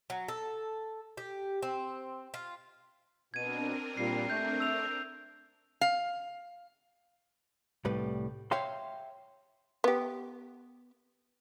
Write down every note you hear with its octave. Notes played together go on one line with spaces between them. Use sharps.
F#3
A4
G4
C4
F4
B2 C4 D4 A#4 G#6 D#7
A#2 G3 C7
A3 G6
E6 F7
F5
C2 A2 G3 B4
C#5 E5 F5 G5 C6
B3 G4